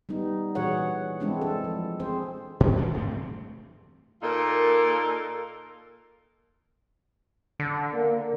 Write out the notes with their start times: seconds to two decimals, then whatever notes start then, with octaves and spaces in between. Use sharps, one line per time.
0.09 G3 B3 D#4
0.55 A#2 E3 F#4 G#4 C#5 F#5
1.20 E3 G#3 C4 D4 E4
1.41 A4
1.64 F3
2.00 C4 G#4 C5
2.60 A#2
2.77 E3 D4
2.94 G2 A3 B3 C4
4.23 A#2 A#3 D#4 F4 A4 A#4
7.60 D3
7.93 A#3